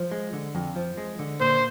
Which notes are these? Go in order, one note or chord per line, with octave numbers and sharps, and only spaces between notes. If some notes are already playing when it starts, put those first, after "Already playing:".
Already playing: F3
G#3
D3
F2
F3
G#3
D3
A#2 C5